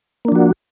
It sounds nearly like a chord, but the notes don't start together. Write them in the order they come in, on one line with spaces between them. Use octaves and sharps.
A#3 D4 F3 F#4